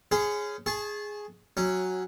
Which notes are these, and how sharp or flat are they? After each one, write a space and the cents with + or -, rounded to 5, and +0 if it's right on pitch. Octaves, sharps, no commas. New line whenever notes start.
C#4 +0 G#4 +0 C5 -45
G#4 +0 A5 -25 C#6 -20
F#3 +0 C#4 -20